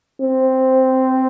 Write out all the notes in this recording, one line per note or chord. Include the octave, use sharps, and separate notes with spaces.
C4